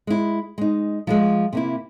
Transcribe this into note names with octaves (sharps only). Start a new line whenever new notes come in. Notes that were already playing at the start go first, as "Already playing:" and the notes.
G#3 E4
G#3 D#4
F3 G3 G#3
C3 A#3 E4